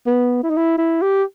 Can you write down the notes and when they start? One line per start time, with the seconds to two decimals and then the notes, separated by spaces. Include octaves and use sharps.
0.07 B3
0.43 E4
0.50 D#4
0.57 E4
0.78 E4
1.02 G4